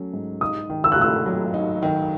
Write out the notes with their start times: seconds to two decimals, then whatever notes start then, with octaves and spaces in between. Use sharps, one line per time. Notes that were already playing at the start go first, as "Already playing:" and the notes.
Already playing: F#3 A3 C#4
0.13 G#2
0.41 D#4 D#6
0.70 D#3
0.84 E6
0.92 F#6
0.98 A3 E6
1.26 F#3
1.54 D#4
1.83 D#3